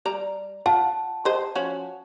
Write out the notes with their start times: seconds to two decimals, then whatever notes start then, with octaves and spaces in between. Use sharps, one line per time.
0.05 G3 D5 A#5
0.66 F4 F#5 A5
1.25 G4 C5 D#5
1.55 F3 C#4 F#4